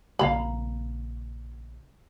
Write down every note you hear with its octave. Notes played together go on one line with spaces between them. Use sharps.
A#1 C#3 A#3 F5 A#5 B5